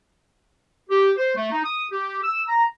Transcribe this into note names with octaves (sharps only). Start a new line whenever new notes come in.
G4
C5
A3
D#4
D#6
G4
E6
A#5